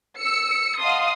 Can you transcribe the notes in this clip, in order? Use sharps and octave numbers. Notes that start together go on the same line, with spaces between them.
E6 C#7
D#5 F5 F#5 A5 C6 D#6